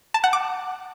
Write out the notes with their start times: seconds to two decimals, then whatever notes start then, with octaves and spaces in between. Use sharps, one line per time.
0.14 A5
0.24 F#5
0.33 D6